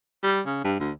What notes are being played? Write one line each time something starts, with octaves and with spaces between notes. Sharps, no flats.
G3
C#3
G2
D2